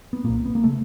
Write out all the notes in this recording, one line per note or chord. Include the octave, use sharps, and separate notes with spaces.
B3
B1 A#2 A#3
B3
A#3
C#3 A3